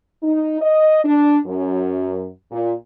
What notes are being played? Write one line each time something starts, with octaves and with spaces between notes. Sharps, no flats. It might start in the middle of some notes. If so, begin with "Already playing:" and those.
D#4
D#5
D4
F#2
A#2